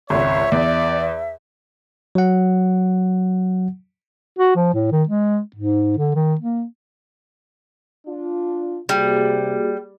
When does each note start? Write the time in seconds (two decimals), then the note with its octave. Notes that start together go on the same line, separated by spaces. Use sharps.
0.10 G#1 C#2 C#5 E5
0.52 E2 D5
2.15 F#3 F#5
4.39 F#4
4.56 F3
4.74 A2
4.92 D#3
5.09 G#3
5.56 G#2
5.98 D3
6.15 D#3
6.41 A#3
8.08 D4 F4
8.89 C3 G3 A#3 F#4 G#4